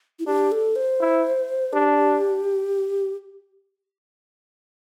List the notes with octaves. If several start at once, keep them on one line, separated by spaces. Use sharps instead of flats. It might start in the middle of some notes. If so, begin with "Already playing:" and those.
E4
D4 G4
A4
C5
E4
D4 G4